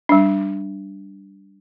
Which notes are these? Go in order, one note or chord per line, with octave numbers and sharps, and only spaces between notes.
G3 D4